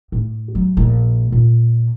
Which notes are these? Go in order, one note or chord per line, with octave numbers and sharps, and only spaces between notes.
A2
F#3
A#1 E4
A#2